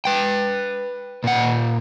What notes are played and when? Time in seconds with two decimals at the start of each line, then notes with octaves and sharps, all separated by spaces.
0.05 B4 G5
1.24 A#2 F#5